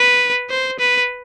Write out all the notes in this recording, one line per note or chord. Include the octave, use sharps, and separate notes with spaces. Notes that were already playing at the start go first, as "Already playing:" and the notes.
Already playing: B4
C5
B4